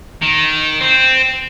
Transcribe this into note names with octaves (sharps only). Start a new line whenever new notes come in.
D#3
C4